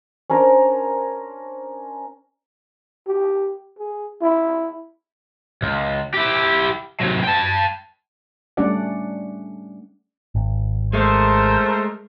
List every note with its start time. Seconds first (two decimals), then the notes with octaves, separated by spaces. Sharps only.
0.30 C#4 D4 A#4 C5
3.07 G4
3.79 G#4
4.22 E4
5.63 C#2
6.14 E4 G4
7.01 C3 F#3
7.24 G5 A5
8.57 G3 A3 C#4 D4 D5 F#5
10.35 G#1
10.93 G#3 A3 A#4 C5